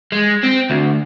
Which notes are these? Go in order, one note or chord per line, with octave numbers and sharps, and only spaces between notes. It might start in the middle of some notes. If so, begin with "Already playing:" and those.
G#3
C4
D2